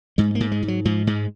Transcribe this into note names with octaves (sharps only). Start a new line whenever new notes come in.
G#2 G#3
A#3
G#2
G#3
G#2
F#3
G#2 F3
G#2 G#3